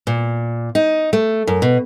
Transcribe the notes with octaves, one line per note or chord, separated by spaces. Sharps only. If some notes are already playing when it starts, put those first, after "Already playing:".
A#2
D#4
A3
F#2
B2